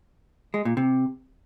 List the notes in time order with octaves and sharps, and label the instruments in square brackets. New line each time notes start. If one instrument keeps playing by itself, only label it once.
[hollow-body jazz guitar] G#3
A#2
C3